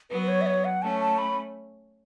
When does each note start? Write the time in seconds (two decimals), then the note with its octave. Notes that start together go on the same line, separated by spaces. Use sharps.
0.10 F#3 B3 B4
0.22 B4
0.28 C#5
0.41 E5
0.46 C#5
0.65 F#5
0.82 A3 C#4 A5
1.00 A5
1.18 B5